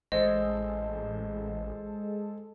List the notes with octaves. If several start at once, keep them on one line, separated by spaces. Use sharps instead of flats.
A1 G#3 A4 C5 D#5